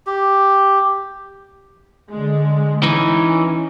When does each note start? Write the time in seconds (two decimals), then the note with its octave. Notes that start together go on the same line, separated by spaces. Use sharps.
0.06 G4
2.10 D3 G#3
2.83 E3 C#4 D#4